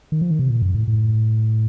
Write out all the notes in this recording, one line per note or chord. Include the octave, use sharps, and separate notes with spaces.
D#3
F3
D#3
C3
A#2
F#2
A2
A2